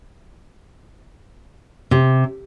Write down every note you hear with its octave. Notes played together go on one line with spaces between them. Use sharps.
C3